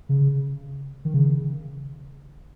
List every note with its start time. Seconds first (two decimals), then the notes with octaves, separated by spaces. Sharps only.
0.09 C#3
1.05 D#3
1.14 C#3